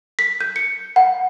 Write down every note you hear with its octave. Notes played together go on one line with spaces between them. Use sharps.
B6
G6
C#7
F#5